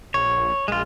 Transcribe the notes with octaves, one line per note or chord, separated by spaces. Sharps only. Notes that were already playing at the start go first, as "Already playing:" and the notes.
A#1 C#5
A#1 G#3 F4